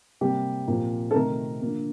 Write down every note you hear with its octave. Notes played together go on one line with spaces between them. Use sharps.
C3 G3 A#3 G4
A#2 F3 C4
A4
C3 D#3 A3 C4 A#4
D3 F3 A#3